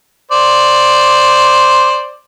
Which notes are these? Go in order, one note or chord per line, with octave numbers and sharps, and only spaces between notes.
C5 D5